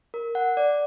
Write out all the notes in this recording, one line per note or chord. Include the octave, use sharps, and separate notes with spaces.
A#4
F#5
D5